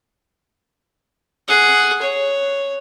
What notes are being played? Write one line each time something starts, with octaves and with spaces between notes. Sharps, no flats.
G#4 F#5
C#5